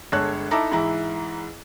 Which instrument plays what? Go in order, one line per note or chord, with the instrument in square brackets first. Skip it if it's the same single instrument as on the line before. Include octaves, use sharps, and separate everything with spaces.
[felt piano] G1 G#3 A4 C#5 F#6
D#4 E4 A4 E5 A#5 D6
G#2 E3 E4 A#5